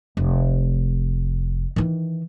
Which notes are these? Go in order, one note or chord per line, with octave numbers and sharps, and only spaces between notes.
F1
D#3 E3